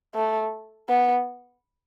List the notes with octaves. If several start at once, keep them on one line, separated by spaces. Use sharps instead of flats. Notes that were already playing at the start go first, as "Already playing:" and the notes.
A3
B3